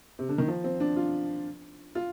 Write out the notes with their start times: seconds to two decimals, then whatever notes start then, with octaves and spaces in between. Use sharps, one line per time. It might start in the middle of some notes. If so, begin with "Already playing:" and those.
0.19 C3
0.29 D3
0.38 D#3
0.48 F3
0.64 C4
0.80 D4
0.96 F4
1.95 F4